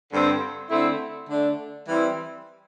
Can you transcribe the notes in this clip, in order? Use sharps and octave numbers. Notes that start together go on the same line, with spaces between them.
G2 D3 C4
D3 A3 C4 E4
D3 A3 D4
E3 G3 C4 E4